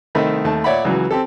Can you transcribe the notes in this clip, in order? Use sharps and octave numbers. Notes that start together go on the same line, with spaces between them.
C2 D#3 A3 C4 D#5 B5
D#2 A3 A5
A#2 C#5 D5 E5 F#5 B5
C#2 E3 F#3
C4 G4 A4